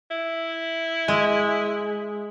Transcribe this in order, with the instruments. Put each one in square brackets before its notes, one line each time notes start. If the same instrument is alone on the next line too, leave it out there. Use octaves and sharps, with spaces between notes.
[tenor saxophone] E4
[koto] G#3